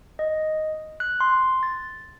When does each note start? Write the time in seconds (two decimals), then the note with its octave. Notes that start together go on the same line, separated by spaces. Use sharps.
0.19 D#5
1.00 F#6
1.20 C6
1.63 A6